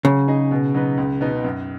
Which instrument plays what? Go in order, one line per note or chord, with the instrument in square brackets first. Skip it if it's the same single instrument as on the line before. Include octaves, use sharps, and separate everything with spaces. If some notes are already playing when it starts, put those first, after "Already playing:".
[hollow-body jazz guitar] C#3 [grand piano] F#3
[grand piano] D#4 G#4 D#5
B2
F#3 D#4 B4
C#2
B2 B3 D#4
F#2